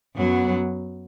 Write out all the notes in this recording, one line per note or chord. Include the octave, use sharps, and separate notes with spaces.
F#2 F#3 B3